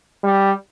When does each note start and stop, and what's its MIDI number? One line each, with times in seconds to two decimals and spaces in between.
0.24 0.52 55